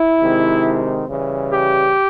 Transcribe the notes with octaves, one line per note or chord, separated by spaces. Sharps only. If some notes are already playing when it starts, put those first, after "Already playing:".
Already playing: E4
C3 D#3 G#3 C4
C#3 E3 G3
G4